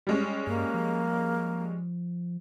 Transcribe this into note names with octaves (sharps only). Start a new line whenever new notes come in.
G3 G#3 C#4
G2 A#3
F3